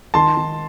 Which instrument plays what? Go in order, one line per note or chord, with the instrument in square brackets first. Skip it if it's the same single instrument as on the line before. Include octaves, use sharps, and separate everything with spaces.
[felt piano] D#3 [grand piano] A5 C6
[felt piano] D#3